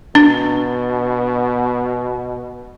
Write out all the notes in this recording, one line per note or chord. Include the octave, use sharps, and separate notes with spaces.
B2 D4